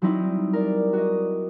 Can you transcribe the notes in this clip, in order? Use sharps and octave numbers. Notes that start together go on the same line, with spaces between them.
F#3 G3 C4 D#4 E4 G4
A#4 D5
F#4 D#5